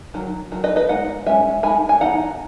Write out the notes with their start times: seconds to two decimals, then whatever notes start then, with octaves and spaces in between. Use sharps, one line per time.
0.14 D#3 F#3
0.52 D#3 F#3
0.64 B4 D#5
0.76 B4 D#5
0.89 G#3 B3 D#4 F#5
1.26 G#3 C#4 E5 G#5
1.63 G#3 D#4 G#5 B5
1.89 G#5
2.00 E3 B3 D#4 F#5 A#5